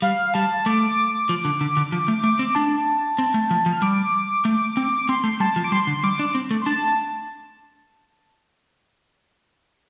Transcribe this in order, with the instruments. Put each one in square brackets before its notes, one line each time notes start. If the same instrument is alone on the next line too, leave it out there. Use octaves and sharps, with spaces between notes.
[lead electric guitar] G3 [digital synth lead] F5
[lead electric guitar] G3 [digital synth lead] A5
[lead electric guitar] A3 [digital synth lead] D6
[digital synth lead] D6
D6
[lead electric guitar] F3
D3
D3
D3
F3
A3
A3
C4
[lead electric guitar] D4 [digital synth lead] A5
[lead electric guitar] C4
A3
F3
F3
[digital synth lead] F6
[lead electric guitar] G3 [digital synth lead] D6
[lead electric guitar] A3
C4
[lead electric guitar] C4 [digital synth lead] C6
[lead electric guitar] A3
[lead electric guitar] G3 [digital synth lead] A5
[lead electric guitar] F3
[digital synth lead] D6
[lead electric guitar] G3 [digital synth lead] C6
[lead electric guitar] D3
[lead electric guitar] G3 [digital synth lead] D6
[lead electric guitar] D4
C4
A3
[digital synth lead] C6
[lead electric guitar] D4 [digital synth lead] A5